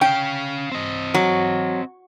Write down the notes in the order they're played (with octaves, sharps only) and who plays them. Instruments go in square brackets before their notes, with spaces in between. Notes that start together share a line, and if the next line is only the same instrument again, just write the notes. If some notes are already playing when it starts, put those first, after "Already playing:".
[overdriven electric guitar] C#4 F5 [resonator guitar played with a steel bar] G5
[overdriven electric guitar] C4 D#5
[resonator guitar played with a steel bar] F#3